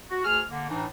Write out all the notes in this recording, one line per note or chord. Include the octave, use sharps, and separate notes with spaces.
F#4
D2 G#4 F6
D3 A#3
A2 E3 D4 D#4